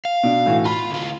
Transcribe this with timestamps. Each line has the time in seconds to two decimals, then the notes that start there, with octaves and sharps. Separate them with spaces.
0.05 F5
0.23 B2 D4
0.46 A2 E3 F#4
0.65 F4 B5
0.91 D2 F4